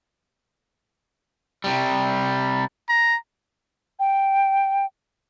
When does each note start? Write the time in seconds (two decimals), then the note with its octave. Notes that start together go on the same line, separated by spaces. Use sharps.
1.64 C3 G3
2.89 A#5
3.99 G5